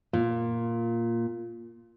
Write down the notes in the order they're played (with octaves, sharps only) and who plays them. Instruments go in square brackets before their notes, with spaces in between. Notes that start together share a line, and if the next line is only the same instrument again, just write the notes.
[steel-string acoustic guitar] A#2 [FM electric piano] F4